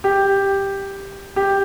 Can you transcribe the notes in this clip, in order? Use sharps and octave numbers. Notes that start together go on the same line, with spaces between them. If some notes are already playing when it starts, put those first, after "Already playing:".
G4
G4